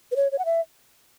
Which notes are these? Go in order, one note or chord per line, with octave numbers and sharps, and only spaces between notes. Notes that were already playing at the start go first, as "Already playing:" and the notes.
B4
C#5
C#5
F#5
E5